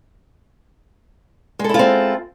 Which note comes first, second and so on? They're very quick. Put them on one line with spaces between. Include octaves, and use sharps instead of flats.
G#3 A4 E4 F4 C4